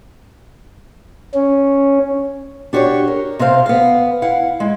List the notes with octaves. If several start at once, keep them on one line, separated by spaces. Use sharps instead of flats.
C#4
D4 F#4 G4 B4 C#5
A#4
C3 C4 C5 F5
B3 F5
E4 F5 F#5
G#3 E4